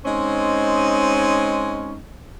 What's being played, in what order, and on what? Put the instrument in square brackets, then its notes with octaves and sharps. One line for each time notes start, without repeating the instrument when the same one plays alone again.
[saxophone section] G#3 C4 C#4 D#4